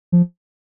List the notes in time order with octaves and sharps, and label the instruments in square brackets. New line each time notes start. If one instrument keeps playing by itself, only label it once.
[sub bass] F3